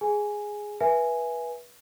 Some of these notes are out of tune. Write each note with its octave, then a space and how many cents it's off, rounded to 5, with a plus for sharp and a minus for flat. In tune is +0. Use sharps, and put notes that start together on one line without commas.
G#4 +0 G#5 +0
B4 -25 E5 +5 G#5 +0